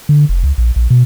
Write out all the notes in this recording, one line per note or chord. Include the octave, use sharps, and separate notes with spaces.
D3
F1
C#2
A#1
A#1
B2